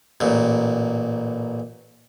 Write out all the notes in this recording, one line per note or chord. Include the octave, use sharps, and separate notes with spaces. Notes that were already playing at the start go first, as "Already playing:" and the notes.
A1 A#2